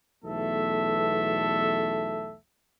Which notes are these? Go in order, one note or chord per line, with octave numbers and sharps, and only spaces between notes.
B1 E2 A3 A4 E5